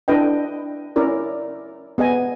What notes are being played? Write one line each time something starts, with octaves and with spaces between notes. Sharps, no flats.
D4 E4 A4 B4 D#5 G5
C#4 E4 A#4 D5
B3 G#4 D#5 G#5